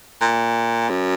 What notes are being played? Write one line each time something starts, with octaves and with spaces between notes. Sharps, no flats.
A#2
F#2